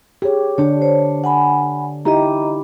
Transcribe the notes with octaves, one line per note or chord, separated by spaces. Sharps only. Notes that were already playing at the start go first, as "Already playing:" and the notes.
G4 G#4 C#5
D3 D4 G4 C#5
C5 C#5
F#5 G#5 B5
D#4 E4 G4 D#5 A#5